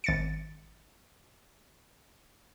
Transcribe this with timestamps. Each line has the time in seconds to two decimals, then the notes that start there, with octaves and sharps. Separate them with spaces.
0.04 G#1 A6 C#7